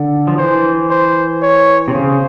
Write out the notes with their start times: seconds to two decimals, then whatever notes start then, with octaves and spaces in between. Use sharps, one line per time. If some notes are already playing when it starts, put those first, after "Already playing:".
Already playing: D3
0.27 F3
0.38 E3 C5
0.90 C5
1.43 C#5
1.88 C3
1.94 C#3 C5